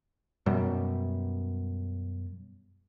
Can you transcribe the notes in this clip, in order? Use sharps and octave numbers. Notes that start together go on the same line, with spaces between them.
F#2 B2 G3